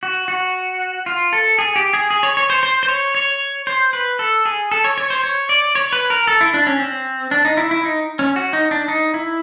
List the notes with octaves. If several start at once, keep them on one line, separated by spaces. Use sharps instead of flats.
F#4
F#4
F4
A4
G#4
G4
G#4
G#4
C#5
C#5
C5
C5
C5
C#5
C#5
C5
B4
A4
G#4
A4
C#5
C#5
C5
C#5
D5
C#5
B4
A#4
A4
E4
D4
C#4
C4
D4
D#4
E4
E4
D#4
C#4
F#4
D#4
D4
D#4
E4